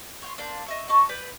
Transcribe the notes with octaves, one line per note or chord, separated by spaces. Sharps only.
C#5 G5 C6
A#3 D4 C5
D#5 E5 C#6
F#4 D#5 A5 C#6
B4 D5 G5